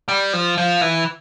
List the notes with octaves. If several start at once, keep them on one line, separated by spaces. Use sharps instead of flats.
G3
F3
F3
E3